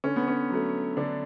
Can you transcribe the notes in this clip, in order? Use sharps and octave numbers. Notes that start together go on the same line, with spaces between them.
D3 C#4
B3
C#4
F#3 A3
D3 D4